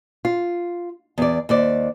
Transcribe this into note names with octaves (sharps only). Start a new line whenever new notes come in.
F4
E2 D5
D#2 C5 D5